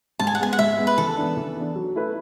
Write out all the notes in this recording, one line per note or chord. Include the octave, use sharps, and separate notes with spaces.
G#2 A5
G#5
F#5
G#3 B3 G#5
F#5
G#2 E5
G#3 B3
B4
E3 A4
B3 D4
E3
B3 D4
F#3
A3 E4 B4 E5